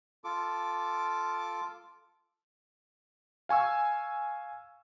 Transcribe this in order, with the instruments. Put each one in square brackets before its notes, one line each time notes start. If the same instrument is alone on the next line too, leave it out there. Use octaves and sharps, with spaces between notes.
[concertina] F4 A4 D6
[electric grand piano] F5 G#5 C#6 E6